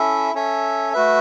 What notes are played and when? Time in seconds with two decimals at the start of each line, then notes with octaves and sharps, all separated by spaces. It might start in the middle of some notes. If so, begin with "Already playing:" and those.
Already playing: C#4 E4 A4 E5
0.34 C#4 A4 C#5 E5
0.93 A3 F#4 B4 E5